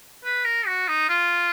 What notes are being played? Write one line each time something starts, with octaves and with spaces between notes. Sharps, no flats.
B4
A#4
F#4
D#4
F4